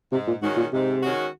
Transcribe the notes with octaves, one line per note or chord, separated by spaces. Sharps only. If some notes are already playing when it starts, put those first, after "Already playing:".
G#2 C3
A#2
G#2 D#3 G#3 C#4 F#4
A#2
G#2 C3
D#3 G#3 C#4 F#4